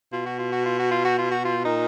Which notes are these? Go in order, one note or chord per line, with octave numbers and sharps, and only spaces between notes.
B2 F4
F#4
F4
F#4
F4
F#4
F4
F#4
F4
F#4
F4
A#2 D#4